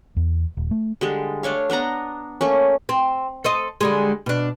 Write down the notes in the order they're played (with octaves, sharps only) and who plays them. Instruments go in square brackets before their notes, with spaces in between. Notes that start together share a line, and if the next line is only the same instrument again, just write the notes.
[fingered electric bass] E2
D#1
A3
[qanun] D3 G3 G#3
A3 D4 C#5 F5
B3 D4 F#5 A#5
A3 A#3 C#4
[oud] C4
A4 C5 D#5
D3 G3 G#3
B2 D4